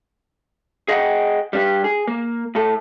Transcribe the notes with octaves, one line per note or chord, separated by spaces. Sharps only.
G#4 D#5 E5 F#5 G5
G3 D4 G4
G#4
A#3
A2 A4